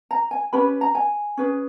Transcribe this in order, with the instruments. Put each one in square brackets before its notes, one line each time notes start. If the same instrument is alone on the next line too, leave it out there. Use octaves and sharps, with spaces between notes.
[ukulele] A#5
G#5
C#4 G4 B4 B5
A#5
G#5
C#4 G#4 B4